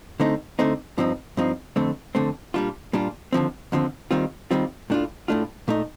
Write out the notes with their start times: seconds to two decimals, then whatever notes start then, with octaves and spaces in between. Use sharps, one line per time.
0.20 D3 A3 C4 D#4
0.59 D3 A3 C4 D#4
0.98 G2 F3 C4 D#4
1.37 G2 F3 C4 D#4
1.76 F2 D3 A3 C4
2.15 F2 D3 A3 C4
2.54 A#2 G3 D4 F4
2.93 A#2 G3 D4 F4
3.33 D#2 D3 F3 C4
3.72 D#2 D3 F3 C4
4.11 D#2 D#3 G3 C4 F4
4.51 D#2 D#3 G3 C4 F4
4.90 A2 A3 D4 F4
5.28 A2 A3 D4 F4
5.68 A#2 A3 D#4